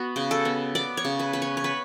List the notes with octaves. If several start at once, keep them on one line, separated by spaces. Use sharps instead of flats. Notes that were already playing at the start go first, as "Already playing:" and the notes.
Already playing: B3 F#4
C#3
A4
B3
B3 D5
C#5
C#3
B4
B3 B4
C#5
C#5
B3 B4